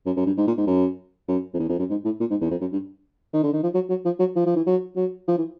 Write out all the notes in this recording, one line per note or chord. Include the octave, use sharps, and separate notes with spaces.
F#2
F#2
G2
G#2
A#2
G#2
F#2
F#2
F2
E2
F2
F#2
G#2
A2
A#2
G#2
E2
F2
F#2
G2
D#3
D3
D#3
F3
F#3
F#3
F3
F#3
F3
F3
E3
F#3
F#3
F3
E3